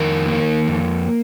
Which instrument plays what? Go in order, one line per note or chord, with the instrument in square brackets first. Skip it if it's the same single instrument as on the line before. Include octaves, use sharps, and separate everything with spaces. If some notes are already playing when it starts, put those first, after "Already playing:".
Already playing: [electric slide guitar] F2 D#3 A#4
A#3
F2